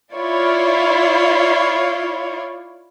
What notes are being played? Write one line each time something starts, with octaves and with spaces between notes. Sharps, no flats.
E4 F4 C#5 D5